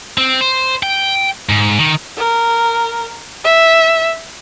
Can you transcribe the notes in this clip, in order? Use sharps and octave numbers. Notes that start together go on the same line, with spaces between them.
C4
C5
G5
G#2
D#3
A#4
E5